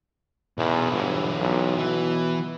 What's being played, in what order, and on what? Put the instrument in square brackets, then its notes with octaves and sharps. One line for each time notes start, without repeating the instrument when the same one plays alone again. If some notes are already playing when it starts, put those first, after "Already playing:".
[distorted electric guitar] B1 E4 [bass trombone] E2
[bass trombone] G1 [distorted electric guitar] E3 F#3
[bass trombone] B1
[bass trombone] B2 [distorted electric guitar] E3